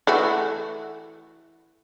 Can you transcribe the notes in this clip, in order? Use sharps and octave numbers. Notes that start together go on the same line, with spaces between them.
E3 A3 F#4